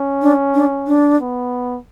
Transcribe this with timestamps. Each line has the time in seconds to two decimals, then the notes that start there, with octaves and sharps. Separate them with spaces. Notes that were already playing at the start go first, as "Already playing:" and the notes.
Already playing: C#4
0.22 D4
0.55 D4
0.87 D4
1.20 B3